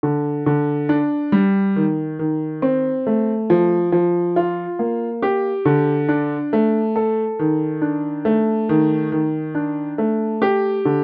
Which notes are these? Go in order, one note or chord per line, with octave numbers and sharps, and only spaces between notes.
D3
D3
D4
G3
D#3
D#3
C4
A3
F3
F3
F4
A#3
G4
D3
D4
A3
A4
D#3
D4
A3
D#3
D#3
D4
A3
G4
D3